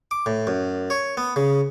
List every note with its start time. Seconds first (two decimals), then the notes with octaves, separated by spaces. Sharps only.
0.11 D6
0.26 A2
0.47 F#2
0.90 C#5
1.17 B3
1.36 C#3